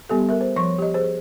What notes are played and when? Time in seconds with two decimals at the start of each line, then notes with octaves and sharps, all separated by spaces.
0.09 G3 B3 G4 A4
0.29 A#4 E5
0.41 C5
0.56 F3 C#5 C#6
0.78 G4 D#5
0.94 G#4 C5